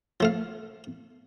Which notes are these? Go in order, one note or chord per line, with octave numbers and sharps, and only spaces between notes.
F3 A3 F5